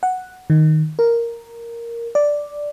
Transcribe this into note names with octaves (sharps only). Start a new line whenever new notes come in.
F#5
D#3
A#4
D5